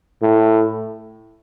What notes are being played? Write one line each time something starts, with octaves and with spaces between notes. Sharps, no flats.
A2